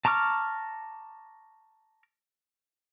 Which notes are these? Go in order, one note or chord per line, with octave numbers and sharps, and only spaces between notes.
A5 A#5 C#6 D6 F6